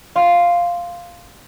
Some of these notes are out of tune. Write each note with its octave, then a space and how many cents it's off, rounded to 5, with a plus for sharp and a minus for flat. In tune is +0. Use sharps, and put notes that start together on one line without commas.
F5 +0 C6 +0